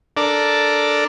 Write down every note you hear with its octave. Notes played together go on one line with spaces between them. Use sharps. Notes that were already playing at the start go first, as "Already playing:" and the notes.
D4 A4 A#4 D5